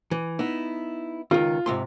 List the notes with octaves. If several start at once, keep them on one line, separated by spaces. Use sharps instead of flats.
E3
B3 D#4 E4
C#2 D#3 F4
G#2 C3 C6